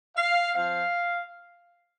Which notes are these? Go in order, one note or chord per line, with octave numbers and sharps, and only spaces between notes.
F5
F3 C4 F5